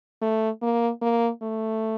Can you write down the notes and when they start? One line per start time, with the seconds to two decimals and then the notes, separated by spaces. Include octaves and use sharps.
0.22 A3
0.62 A#3
1.02 A#3
1.42 A3